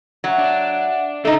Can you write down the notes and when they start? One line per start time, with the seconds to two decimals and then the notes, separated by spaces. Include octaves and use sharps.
0.24 F#3 E5 F#5
0.38 D4
1.25 D3 A3 D#4